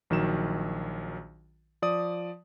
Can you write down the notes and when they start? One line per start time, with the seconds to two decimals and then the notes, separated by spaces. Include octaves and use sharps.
0.10 A#1 D#3 F#3 E7
1.82 F3 D5 D#6